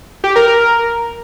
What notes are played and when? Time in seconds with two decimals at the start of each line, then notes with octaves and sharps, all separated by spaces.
0.24 G4
0.36 A#4
0.48 A#4